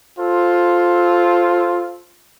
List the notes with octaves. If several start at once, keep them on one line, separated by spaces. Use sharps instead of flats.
F4 A4 C5